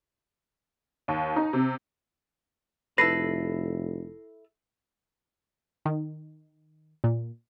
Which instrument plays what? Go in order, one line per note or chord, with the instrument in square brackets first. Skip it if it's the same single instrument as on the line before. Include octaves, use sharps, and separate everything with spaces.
[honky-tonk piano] D#2
D#4
C3
[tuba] F1 [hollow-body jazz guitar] E4 A4 B4 [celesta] A#6 C7
[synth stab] D#3
A#2